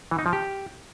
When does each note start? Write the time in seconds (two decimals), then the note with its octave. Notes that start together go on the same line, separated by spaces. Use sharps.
0.11 E3
0.19 D#4
0.26 F3
0.33 G4